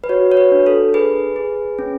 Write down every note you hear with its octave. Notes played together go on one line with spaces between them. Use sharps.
B4
F#4 C#5
C#5
B4
D4
A4
G#4 B4
G#4
C#4